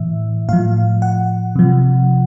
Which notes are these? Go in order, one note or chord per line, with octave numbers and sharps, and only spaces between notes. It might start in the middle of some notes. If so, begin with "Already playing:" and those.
Already playing: A2 E3 E5
A2 F3 F5
F#5
C3 F3